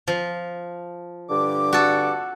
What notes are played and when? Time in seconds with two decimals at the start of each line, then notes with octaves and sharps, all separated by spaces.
0.08 F3
1.30 G2 D3 D6
1.73 F#4 A4